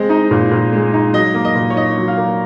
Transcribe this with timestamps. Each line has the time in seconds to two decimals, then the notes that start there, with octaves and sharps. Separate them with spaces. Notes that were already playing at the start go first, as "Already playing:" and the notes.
Already playing: G#3 C4 D#5
0.09 D#4
0.31 A#2
0.51 A#2
0.73 G#3
0.93 D#4
1.13 F#3 D#5
1.34 A#3
1.45 D#5
1.55 A#2
1.70 C#5
1.76 D#4 D#5
1.98 F#3
2.08 F5
2.18 A#3